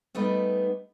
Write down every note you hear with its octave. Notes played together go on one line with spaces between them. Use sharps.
G3 A3 B3 D4 D#4 B4